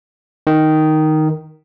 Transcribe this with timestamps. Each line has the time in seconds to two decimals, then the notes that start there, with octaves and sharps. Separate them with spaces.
0.47 D#3